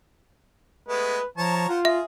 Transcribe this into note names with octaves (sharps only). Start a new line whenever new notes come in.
G#3 A3 B3 B4
F3 C#5 A5 A#5
F4 C5 F#5
G#4 E5